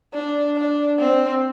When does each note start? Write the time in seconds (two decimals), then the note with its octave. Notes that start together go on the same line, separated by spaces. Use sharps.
0.14 D4
0.56 D4
1.00 C4